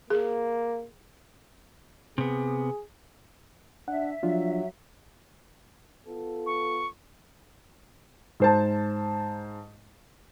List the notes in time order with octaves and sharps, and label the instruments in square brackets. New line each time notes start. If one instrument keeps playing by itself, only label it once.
[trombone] A#3 [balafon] G#4
[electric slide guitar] C3 B3 [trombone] G#4
[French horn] D4 [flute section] E5 [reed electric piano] F#5
[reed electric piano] F3 D4 F4 [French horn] F#3
[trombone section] B3 F4 A4
[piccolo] C#6
[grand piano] G#2 C5 A5